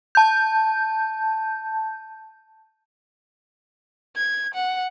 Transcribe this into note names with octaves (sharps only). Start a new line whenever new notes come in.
A5 G6
G#6
F#5